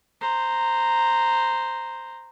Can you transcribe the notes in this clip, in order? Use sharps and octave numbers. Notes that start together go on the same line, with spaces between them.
C5 A#5